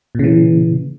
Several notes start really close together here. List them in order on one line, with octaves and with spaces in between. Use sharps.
A#2 C#3 E3